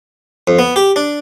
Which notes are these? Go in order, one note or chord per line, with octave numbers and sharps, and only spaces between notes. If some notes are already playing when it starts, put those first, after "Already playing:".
F2
B3
G4
D4